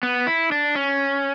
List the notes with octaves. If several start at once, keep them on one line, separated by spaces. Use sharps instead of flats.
B3
E4
D4
C#4